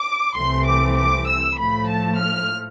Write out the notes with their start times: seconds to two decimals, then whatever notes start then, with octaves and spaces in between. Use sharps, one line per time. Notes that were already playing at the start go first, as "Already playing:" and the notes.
Already playing: D6
0.36 C2 C3 E3 A3 C4 C6
0.67 D6
0.97 D6
1.28 E6
1.57 A2 F3 A3 B5
1.88 A5
2.18 F6